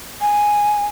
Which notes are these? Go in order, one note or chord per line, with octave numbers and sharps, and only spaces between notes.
G#5